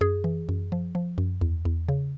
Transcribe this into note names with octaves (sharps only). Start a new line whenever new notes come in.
F#2 G#4
E3
F#2
F3
F3
F#2
E2
E2
C#3